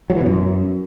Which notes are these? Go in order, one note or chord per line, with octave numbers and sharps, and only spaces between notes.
F#3
E3
B2
F#2